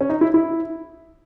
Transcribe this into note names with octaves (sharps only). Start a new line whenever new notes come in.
C#4
D#4
E4
E4